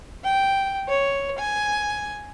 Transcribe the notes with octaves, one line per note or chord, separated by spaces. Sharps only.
G5
C#5
G#5